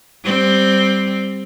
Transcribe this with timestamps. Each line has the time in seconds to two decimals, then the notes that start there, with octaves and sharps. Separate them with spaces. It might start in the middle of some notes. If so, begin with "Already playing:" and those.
0.24 G3 C4